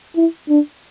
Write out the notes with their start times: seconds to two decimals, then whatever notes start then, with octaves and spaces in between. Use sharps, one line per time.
0.16 E4
0.49 D4